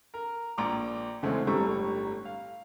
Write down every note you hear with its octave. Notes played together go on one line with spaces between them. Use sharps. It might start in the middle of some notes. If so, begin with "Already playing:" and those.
A#4
A#1 A#5 D6
E2 C#3 G#3 A3 C4 C#4
G1 A2 G3 A#5 C#6 E6
F5